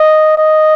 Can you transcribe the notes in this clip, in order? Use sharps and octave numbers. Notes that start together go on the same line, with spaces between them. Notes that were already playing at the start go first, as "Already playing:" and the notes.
Already playing: D#5
D#5